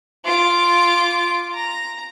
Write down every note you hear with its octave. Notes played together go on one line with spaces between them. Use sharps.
F4 D6
A#5